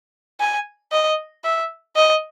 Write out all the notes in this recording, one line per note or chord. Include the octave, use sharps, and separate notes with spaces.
G#5
D#5
E5
D#5